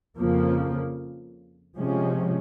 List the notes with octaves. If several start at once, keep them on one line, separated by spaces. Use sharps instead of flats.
F2 C#3 F3 A#3
C3 F3 G#3 C#4